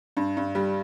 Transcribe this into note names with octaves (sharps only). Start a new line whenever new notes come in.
G2
G2
G3